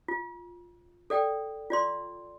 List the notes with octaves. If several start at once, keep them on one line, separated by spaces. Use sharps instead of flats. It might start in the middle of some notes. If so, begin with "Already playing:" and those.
F4
A4 D5 G5
F4 D5 C6